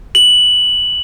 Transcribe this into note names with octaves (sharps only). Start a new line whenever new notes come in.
F#7